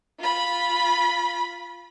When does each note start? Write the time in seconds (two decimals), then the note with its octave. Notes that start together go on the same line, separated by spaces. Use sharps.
0.19 F4 B5